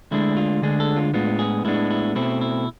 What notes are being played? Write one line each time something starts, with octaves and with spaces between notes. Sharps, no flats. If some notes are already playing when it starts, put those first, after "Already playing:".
D2 D3 G#3 D4 E4
F4
D2 D3 G#3 D4 G#4
A4
F4
A2 G#3 B3 D4 F4
G#4
A2 G#3 B3 D4 E4
E4
B2 A3 C4 E4
E4